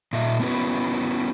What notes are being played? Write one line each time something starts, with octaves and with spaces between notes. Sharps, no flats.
A#2 D#5 E5
B3 C#4 E4 F#4 B4